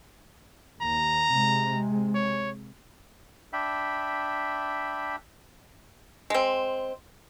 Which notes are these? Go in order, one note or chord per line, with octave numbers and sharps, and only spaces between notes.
D#2 A#5
C3 G#3
C#5
D4 E5 G5 B5
G#3 C4